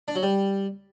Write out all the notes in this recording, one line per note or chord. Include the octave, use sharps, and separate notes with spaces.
D4
F#3
G3